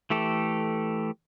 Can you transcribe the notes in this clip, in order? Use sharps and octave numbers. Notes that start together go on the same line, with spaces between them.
E3 A3 G4 A4